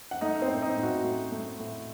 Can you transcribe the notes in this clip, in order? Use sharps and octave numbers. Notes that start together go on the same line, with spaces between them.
F#5
A3 D#4 D#5
C4 C5
A2
D#4
A2
F#4
A3
A3
A2